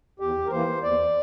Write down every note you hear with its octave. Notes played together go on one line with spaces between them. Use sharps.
E2 G4
A#4
E3 A#3 C5
E2 D5